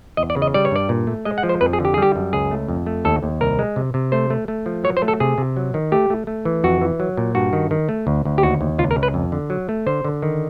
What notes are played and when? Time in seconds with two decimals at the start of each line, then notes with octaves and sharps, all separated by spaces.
0.17 E2 D#5
0.30 D5
0.36 C#3
0.42 D#5
0.54 G3 D5
0.65 C#5
0.72 G2 D5
0.89 A#2
1.07 A3
1.25 G#3 D#5
1.38 F#5
1.43 F3
1.49 C5
1.61 F2 B4
1.73 G#4
1.80 D3 G4
1.94 G#4
1.98 G3 G4
2.16 F#2
2.33 C#2 G#4
2.51 A3
2.68 F2
2.86 A3
3.05 D#2 A4
3.23 D#2
3.41 C2 A#4
3.59 G#3
3.76 C3
3.94 C3
4.12 A3 C5
4.30 A3
4.48 A3
4.66 F3
4.84 F#3 C#5
4.97 C5
5.02 A3
5.08 A4
5.20 C3 G#4
5.38 C3
5.57 F#3
5.74 D#3
5.92 A3 G4
6.10 A3
6.27 A3
6.45 E3
6.64 F2 F#4
6.81 E3
7.00 F#3
7.17 A#2
7.35 G2 F#4
7.53 D#3
7.71 D#3
7.89 A3
8.07 D2
8.25 D2
8.38 G4
8.43 D#2 F#4
8.61 D#2
8.78 C#2 F4
8.91 A#4
8.97 C#2
9.03 B4
9.14 F2
9.32 D3
9.50 F#3
9.69 A3
9.86 D3 C5
10.05 D3
10.22 D#3